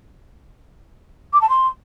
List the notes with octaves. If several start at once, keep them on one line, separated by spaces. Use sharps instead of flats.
D6
A5
C6